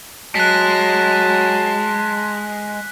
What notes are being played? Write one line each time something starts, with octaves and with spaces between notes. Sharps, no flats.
F#3 G#3 A5 F#6 B6